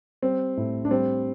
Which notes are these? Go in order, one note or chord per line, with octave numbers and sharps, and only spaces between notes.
G3 C4
A2
D4
G3 C4